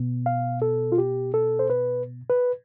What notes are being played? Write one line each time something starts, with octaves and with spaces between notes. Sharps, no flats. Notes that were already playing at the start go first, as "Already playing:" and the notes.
Already playing: B2 B3
F5
A4
F4
G4
A4
C5
B4
B4